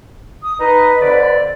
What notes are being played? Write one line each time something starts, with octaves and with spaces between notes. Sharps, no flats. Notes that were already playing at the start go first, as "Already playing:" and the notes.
D#6
D#4 B4 D#5
F2 D3 D5